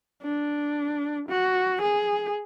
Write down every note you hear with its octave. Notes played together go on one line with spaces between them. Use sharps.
D4
F#4
G#4